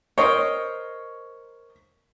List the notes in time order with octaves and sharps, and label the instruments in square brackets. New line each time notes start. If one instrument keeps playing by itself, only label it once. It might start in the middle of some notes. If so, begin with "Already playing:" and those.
[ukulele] A#4 C5 D#5 [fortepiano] C#5